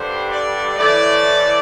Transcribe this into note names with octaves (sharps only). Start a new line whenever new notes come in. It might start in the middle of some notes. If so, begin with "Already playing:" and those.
Already playing: G2 D3 G3 C5
D5
A2 E3 A3 D5